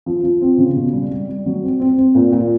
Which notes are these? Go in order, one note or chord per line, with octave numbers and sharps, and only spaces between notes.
F3
F3
C4
C#3
B2
G3
G3
G3
F#3
C4
C4
C4
A#2
A#2